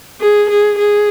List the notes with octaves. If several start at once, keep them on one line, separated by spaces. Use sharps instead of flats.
G#4
G#4
G#4